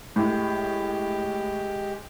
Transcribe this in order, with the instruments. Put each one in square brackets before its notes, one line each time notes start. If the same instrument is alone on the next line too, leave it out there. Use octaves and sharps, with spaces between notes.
[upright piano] A2 [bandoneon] G#3 G4